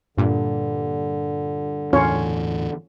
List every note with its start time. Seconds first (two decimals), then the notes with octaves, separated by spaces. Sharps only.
0.18 G2 A#2 D3
1.93 E2 A2 E3 C#4 F4 C#5